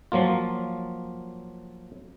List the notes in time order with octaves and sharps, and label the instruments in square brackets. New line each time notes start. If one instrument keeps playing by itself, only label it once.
[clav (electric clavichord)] F3 F#3 A#3 F4